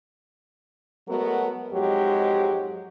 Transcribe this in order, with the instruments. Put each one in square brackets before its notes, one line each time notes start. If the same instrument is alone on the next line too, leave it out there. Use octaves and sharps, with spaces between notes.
[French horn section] F#3 G#3 A3 B3 F#4 A#4
F2 G#2 F#3 G#3 G4